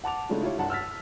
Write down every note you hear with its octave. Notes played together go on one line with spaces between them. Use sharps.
F#5 A5 D6 F7
C#3 G#3 A3 D4 E4 F4
E4 F4 G4 C#5
C2 G2 F#5 A5
E6 F6 A6 B6